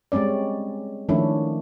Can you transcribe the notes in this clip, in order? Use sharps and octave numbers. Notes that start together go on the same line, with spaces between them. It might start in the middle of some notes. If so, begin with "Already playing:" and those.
G3 G#3 C4 C#4 D5
D#3 F3 A3 C#4 D4 E4